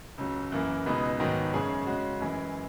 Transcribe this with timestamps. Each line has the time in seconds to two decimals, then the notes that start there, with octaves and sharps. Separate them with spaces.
0.18 C#2 C#3 F#3
0.52 F#2 E3 A#3
0.86 C#2 B2 G#3 B3 D#4
1.20 G#2 D#3 F#3 B3
1.54 F#2 C#3 G#3 C#4 G#4
1.86 C#3 G#3 C#4 F#4
2.20 F#2 E3 G#3